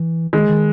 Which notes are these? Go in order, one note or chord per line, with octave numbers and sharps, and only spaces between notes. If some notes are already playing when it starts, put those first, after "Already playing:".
Already playing: E3
D#3 G#3
D#3